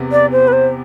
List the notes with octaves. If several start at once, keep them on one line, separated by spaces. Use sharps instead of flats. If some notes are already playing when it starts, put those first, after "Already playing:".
Already playing: E2 C3 B3
D5
C5
B4
C5